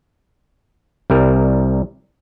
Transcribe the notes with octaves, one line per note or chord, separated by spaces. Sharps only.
C2 G3 A#4